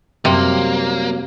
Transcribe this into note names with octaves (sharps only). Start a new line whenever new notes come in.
F#2 C3 F#3 G3 A#3